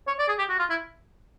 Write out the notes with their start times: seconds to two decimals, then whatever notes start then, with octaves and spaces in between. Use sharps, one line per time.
0.07 C#5
0.19 D5
0.28 G#4
0.39 G4
0.49 F#4
0.59 F4
0.70 E4